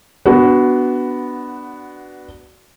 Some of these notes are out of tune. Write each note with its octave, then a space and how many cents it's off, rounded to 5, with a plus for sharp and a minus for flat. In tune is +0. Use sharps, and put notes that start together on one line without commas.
B3 +0 D4 +0 F#4 +15